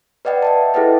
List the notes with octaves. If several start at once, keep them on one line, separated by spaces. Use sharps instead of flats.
B4 D5 D#5 F#5 G5
E5 G5 A5
E4 G#4 A4 B4 D#5